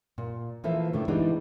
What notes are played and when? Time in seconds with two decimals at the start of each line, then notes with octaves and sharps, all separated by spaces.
0.18 A#2
0.64 E3 F3 A#3 A4 C5 E5
0.93 A2 C#3 A3 D4
1.08 E3 G3 G#3 B3 D4 D#4